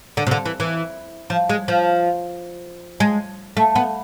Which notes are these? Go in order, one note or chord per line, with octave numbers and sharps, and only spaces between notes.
D3
C3
D3
E3
E3
F3
G#3
F3
G#3
A3
B3